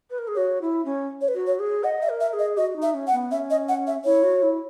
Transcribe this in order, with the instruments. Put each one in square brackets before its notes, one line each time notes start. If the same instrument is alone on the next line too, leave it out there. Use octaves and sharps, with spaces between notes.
[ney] B4
A#4
G#4
[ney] F#4 [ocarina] C#5
[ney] E4
C#4
[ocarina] C#5
B4
[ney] F#4
[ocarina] C#5
[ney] G#4
[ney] D#5 [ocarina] F#5
[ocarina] E5
[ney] A#4
[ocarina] E5
[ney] G#4
[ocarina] D#5
[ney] F#4 [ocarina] D#5
[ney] D#4
[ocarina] E5
[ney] C#4
[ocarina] F#5
[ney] B3
[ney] C#4 [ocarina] E5
[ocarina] D#5
F#5
E5
[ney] E4 [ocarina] C#5
[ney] F#4
E4